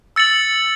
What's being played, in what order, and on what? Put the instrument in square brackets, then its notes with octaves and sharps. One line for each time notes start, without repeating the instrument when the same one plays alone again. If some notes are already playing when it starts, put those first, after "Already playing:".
[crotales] E6 A6 C#7 F#7